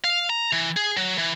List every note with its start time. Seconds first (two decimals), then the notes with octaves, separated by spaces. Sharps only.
0.04 F5
0.30 A#5
0.53 E3
0.77 G#4
0.97 F#3
1.18 E3